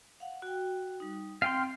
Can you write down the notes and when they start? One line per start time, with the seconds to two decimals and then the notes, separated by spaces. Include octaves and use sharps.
0.20 F5 F#5
0.42 F#4 G5
1.00 G3 D#4
1.42 C4 F5 G5 C6